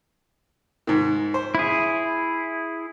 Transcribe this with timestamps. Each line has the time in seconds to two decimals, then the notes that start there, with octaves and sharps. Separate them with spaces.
0.87 G#2 D#3
1.34 C5
1.55 E4 G#4